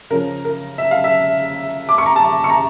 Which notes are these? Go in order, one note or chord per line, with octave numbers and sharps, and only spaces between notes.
C#3 F3 C#4 A#4
A#4
E5
F5
E5
D6
C#6
A#5
A5
C#6
A#5